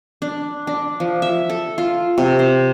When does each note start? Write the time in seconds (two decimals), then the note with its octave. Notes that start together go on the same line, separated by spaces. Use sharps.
0.22 D4
0.67 D4
1.00 F3
1.22 E5
1.49 A4
1.78 F4
2.18 C3
2.39 C5